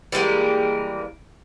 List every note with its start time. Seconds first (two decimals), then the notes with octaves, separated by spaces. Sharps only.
0.12 E3 G3 G#3 A#3